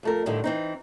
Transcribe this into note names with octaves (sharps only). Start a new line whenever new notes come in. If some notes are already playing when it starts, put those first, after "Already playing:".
F2 A3 A#4
A2 D3 D#3 G3
E3 C4 D#4